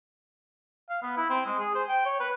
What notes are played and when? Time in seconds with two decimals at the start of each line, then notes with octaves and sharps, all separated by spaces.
0.90 F5
1.02 B3
1.17 E4
1.29 C4
1.46 G#3
1.59 G#4
1.75 C5
1.89 G5
2.05 C#5
2.20 B4